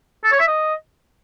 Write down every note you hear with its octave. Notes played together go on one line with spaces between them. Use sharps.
A4
C#5
E5
D#5